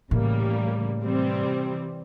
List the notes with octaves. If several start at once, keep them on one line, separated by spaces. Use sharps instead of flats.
A2 C#3 E3 G3 A#3
C3 E3 G3 C4